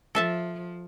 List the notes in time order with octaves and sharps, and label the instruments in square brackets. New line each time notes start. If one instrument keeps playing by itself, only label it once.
[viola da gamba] F3 [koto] A4 E5 A5